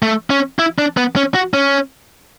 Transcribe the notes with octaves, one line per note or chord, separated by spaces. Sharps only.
A3
C#4
E4
D4
B3
C#4
F#4
C#4